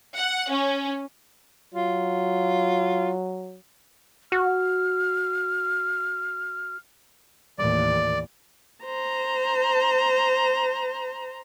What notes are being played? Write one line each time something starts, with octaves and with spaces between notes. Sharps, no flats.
F#5
C#4
F#3 F4
F#4 F6
D#2 A2 E3 D5
C5 A#5